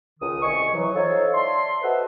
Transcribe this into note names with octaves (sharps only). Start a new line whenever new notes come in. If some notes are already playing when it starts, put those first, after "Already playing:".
C#2 D#3 D#6
C2 D#5 G#5 C#6
E3 F#3
D#4 F4 A4 C5 C#5
D5 E5 A5 C6
F#4 A4 B4 C5 D#5 E5